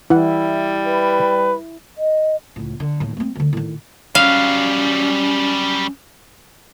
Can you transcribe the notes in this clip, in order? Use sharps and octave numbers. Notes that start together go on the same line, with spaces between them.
E3 G3 E4 F#5
B4
D#5
C#2 A2
D3
D#2 A2
A3 C4
D2 D3
A2 D#3
F#3 G3 C#4 F5